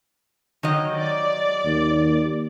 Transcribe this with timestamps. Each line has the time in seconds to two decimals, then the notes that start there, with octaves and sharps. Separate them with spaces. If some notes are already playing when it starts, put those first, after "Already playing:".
0.63 D#3 F#3 D#5
0.95 D5
1.65 D#2